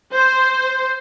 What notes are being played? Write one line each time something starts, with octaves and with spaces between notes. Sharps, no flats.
C5